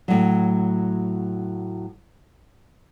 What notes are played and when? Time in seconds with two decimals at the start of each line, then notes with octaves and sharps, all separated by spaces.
0.08 A2 F#3